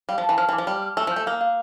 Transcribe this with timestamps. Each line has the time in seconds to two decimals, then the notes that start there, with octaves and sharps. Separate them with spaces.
0.09 G3 F5
0.18 F3
0.23 A5
0.29 E3
0.38 F3 F6
0.49 E3
0.53 D6
0.58 F3
0.67 G3 F6
0.82 F6
0.97 A3 E6
1.07 F3
1.11 A3 G6
1.26 A#3 F5
1.41 F5